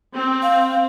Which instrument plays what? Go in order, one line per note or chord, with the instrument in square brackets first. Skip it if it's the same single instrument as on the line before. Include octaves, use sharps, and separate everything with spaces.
[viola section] C4
[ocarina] F5